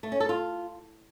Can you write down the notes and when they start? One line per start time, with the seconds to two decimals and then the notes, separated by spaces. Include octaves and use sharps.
0.03 A3
0.12 C#4
0.20 A4
0.29 F4